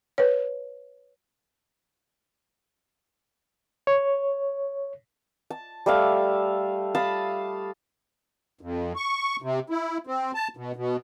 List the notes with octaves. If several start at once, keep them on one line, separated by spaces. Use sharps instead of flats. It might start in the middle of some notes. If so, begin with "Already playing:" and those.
B4 C#5
C#5
A5
G3 A3 E5 F5
F5 A5 B5 D#6
F2
C#6
C3
E4
C4
A5
B2
B2